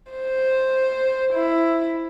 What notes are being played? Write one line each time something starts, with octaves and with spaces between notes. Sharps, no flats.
C5
E4